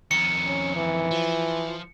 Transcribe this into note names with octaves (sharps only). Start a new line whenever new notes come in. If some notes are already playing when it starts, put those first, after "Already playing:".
F2 D#3 C#7
C#4
E3
F3